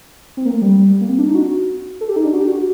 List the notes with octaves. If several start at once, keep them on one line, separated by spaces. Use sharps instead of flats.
C4
A#3
A3
G3
A#3
C4
D4
D#4
F#4
A4
G4
D#4
D4
F#4
G4
F#4